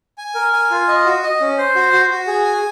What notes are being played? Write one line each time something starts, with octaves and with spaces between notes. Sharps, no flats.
G#5
A#4
G#5
F4
D#5
F#4
D#5
C#4
C5
F#4
F#4
F#4
G#4
G#5